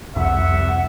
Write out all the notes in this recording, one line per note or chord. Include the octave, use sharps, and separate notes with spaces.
C2 F2 E5 F#5